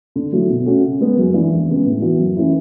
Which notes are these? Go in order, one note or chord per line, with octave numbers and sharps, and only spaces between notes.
D3
F#3 A3 E4
B2
A3 C#4 F#4
C#3
G#3 B3
F#2
E3 G#3 D4
E2
C#3 G#3 B3
A2
E3 B3 F#4
F#2
E3 A3 C#4 E4